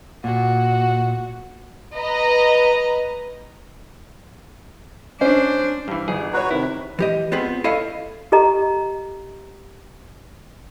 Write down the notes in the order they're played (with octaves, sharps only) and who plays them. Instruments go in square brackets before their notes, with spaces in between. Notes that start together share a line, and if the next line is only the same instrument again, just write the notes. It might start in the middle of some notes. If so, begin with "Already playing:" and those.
[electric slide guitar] A#2 [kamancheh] F#4
[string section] B4 D#5 A#5
[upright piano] C#4 [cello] D4 [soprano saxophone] C5
[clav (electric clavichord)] G2 E3
[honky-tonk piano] G1 [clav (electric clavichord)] G#4
[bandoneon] F#4 B4 [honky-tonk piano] C#5 A#5
[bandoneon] C3 [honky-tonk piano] D#3 [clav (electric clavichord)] E4
[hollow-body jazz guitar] E3 G4 D#5
B3 C4 F4 G#4 B4
E4 A4 C#5 D#5 F5
[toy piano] G4 A4 D#5 A#5